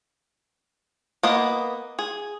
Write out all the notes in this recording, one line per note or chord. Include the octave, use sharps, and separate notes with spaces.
A#3 B3 D#5
G#4